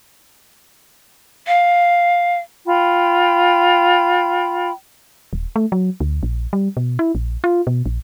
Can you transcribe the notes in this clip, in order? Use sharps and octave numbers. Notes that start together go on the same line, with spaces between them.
F5
F4 G5 B5
D#1
A3
F#3
D2
A#1
G3
B2
E4
A#1
F4
B2
A#1